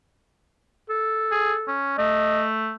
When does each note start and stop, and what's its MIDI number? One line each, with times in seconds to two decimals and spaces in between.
0.90 1.77 69
1.32 1.53 68
1.68 1.94 61
1.98 2.74 57
1.98 2.45 75